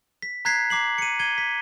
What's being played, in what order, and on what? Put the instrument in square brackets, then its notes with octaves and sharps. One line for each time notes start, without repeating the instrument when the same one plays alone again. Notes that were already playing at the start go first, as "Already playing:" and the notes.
[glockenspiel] B6
A#5 F#6 G#6 B6 C7
A#5 D6 C7 F#7
C#7 D#7
G#6 D#7 G7
B6